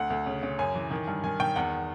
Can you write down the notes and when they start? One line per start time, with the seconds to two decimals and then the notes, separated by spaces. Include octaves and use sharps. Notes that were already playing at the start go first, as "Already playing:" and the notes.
Already playing: D2 F#5
0.10 D2
0.26 C#3
0.43 C#3
0.59 F#2 G#5
0.75 E3
0.91 D#3
1.07 G2
1.24 D#3 G#5
1.40 D#3 G5
1.56 E2 F#5